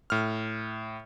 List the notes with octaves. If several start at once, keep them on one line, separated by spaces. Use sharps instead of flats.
A2 F6